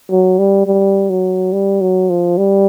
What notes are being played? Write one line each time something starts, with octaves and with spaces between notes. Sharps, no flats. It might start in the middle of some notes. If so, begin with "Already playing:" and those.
F#3
G3
G3
F#3
G3
F#3
F3
G3